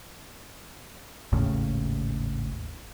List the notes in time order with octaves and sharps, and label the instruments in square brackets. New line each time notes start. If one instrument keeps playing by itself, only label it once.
[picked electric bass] G#1 D#2 A2 C#3